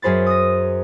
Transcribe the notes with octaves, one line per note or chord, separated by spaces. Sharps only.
F#2 G#4 C5 B5 A6
D#6 A#6